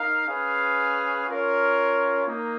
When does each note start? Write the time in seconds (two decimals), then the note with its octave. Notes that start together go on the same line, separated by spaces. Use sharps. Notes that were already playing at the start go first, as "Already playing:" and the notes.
Already playing: D#4 A#4 F5
0.27 C#4 G#4 B4 F5
1.28 C#4 F4 A#4 C#5
2.27 A#3 D#4